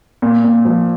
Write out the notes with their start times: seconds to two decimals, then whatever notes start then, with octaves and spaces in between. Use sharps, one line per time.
0.22 A#2
0.44 A#2
0.65 F3